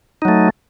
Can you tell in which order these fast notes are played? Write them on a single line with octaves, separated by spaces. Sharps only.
D#4 F#3 A3